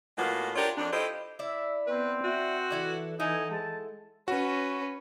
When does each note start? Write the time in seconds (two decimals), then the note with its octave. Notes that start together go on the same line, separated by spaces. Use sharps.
0.18 A2 G#3 A#3 B3 F4 F#4
0.56 D4 F4 G4 A#4 C#5 D5
0.78 F2 D4
0.92 E4 F4 G4 A4 C5 D#5
1.39 E4 D5 E5
1.87 B3 C4 B4
2.24 F#4 E5
2.71 E3 D4 E4 A4
3.20 D#4 E4 A4 F#5 G#5
3.50 G#3 A5
4.28 C#4 F#4 B4